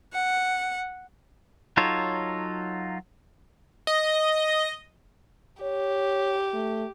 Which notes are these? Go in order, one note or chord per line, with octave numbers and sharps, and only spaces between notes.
F#5
F#3 D#4 F4 A4 C#5
D#5
G4 C#5
A3